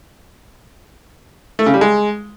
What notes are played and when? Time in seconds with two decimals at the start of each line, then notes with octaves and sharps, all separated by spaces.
1.59 A3
1.66 C#3
1.74 G3
1.81 G#3